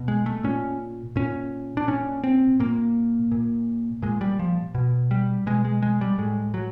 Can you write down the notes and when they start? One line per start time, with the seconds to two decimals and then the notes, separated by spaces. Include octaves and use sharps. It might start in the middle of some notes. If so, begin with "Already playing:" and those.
Already playing: B2
0.08 G#3
0.26 A3
0.44 A#2 C#4
1.16 A#2 C#4
1.77 D4
1.88 A#2 C#4
2.24 C4
2.60 A#2 A#3
3.31 A#2
4.02 A#2 G#3
4.21 G3
4.39 F3
4.75 B2
5.11 G3
5.46 B2 G#3
5.65 G#3
5.82 G#3
6.01 G3
6.18 A2 G#3
6.54 F#3